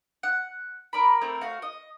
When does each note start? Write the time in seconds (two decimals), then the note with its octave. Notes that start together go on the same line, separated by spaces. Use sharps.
0.23 F#5
0.93 A#4 D5 B5
1.21 A3 C4 E4 A#4
1.41 A3 F#4 F5
1.62 D#5